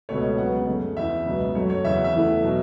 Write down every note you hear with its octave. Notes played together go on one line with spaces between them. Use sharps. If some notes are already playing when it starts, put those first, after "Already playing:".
C#2 B2 A3 C#5
C#2 C#3 F#3 B3 F#5
F#2 C#3 A3
E2 C#3 E3 E5
C#2 B2 F#3 B3
F#2 F#3 A3 C#5
C#5
E2 C#3 F#3 E5
F#5
E5
E2 E3 A3
B2 F#3